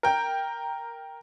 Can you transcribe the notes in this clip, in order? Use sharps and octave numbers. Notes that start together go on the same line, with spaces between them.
A#4 G5